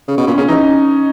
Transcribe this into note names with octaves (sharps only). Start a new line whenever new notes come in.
C#3
B2
A#2 C#4
C#3 C#4
E3 D#4